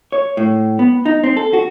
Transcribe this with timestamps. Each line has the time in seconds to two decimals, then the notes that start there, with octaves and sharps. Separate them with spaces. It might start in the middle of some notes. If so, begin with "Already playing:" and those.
0.12 C#5
0.37 A2
0.79 B3
1.05 D#4
1.24 C4
1.37 A4
1.53 F#4